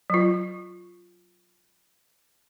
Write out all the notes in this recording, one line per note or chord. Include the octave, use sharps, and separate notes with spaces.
F#3 F4